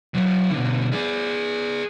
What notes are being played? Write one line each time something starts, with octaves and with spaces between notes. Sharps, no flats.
F#3 E4
B2 D3
G#4 D5